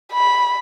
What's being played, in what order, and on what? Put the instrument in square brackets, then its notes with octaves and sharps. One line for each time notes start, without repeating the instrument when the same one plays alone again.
[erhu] B5